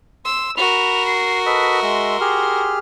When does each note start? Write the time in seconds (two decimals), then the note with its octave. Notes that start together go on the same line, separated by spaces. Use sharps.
0.25 C6 E6
0.57 F#4 A#4 B5 F7
1.06 C7
1.46 A4 B4 D#5 B6
1.82 G#3 E5 C6 E6
2.21 G4 G#4 F6